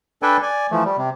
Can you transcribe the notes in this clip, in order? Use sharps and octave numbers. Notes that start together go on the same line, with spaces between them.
D4 A4 B4 D5 G5 G#5
D5 G#5
E3 F3 A3
G3
C3